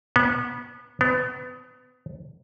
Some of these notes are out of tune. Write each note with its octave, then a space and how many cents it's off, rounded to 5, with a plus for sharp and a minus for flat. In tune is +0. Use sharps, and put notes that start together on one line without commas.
B3 -25
B3 +30